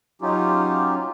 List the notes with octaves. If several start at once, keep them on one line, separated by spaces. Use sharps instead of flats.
F#3 C#4 D#4 F4 G4